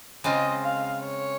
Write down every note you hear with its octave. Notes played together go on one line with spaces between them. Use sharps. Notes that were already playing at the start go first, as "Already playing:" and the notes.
C#3 G#3 C4 F4 D#5
F5
C#5